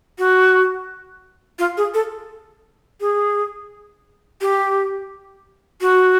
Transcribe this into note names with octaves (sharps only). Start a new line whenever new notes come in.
F#4
F4
G#4
A4
G#4
G4
F#4